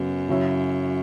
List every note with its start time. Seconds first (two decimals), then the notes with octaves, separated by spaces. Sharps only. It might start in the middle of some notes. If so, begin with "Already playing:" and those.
Already playing: F#2 C#3 F#3 B3
0.29 C#3 F#3 E4 C#5 E5